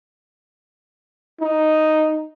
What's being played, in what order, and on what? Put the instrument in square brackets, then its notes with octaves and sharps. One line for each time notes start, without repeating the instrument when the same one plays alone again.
[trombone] D#4